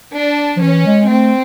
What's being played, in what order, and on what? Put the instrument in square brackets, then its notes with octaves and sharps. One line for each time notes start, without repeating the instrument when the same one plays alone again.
[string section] D4
[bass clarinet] F3
[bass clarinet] E3 [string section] C#4
[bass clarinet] G#3
[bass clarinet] A3 [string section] C4